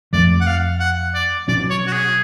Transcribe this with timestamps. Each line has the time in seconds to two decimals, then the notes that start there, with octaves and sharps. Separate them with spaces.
0.13 F2 F3 A3 D5
0.41 F#5
0.47 F5
0.80 F#5
1.15 D5
1.48 B2 F#3 C#4 D5
1.70 C#5
1.87 F#4
1.93 G#4